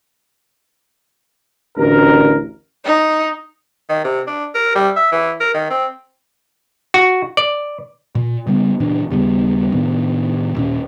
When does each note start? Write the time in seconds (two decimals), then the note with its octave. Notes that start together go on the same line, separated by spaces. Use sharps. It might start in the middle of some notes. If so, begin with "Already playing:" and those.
1.78 A1 D2 A#4
2.85 D#4
3.90 D#3
4.04 C3
4.27 D4
4.55 A#4
4.75 G3
4.97 E5
5.12 E3
5.41 A#4
5.54 D#3
5.70 C4
6.94 F#4
7.37 D5
8.15 A#2
8.47 C#3 G3 B3
8.80 C#2 A#2 E3 D4
9.11 D#2 C#3 G3 B3
9.72 A2 C3 D#3 B3
10.55 D#2 A#2 C#4